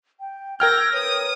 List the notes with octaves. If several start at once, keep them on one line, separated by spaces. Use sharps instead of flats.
G5
A#4 G5 E6 F6 G6 G#6 A#6
B4 C#5 D#6